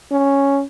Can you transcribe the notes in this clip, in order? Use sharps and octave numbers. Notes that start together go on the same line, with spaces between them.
C#4